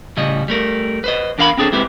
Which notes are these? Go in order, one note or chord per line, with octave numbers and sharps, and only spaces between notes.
A2 C#3 G3 D#5
G3 A3 A#4
B4 C5 D#5
E2 D4 A#4 F5 F#5 B5
C4 D4 G#4 A4 C5
G#3 C4 E4 G4 B4 C5